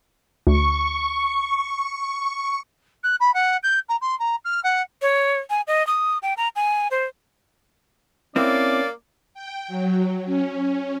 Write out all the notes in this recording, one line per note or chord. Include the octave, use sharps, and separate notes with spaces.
D2 C#6
F#6
B5
F#5
G6
A#5
C6
A#5
F6
F#5
C#5
G#5
D#5
D#6
G5
A#5
G#5
C5
A#3 C4 C#4 E4 D5
G5
F#3
C#4